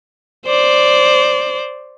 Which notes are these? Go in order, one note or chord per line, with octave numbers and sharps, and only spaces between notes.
C5 D5